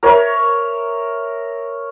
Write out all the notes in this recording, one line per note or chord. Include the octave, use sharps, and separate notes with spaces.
A#4 C#5 E5